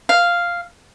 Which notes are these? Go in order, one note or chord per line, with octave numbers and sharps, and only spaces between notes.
F5